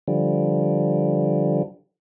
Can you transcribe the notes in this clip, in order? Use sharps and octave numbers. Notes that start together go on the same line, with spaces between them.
D3 F3 G3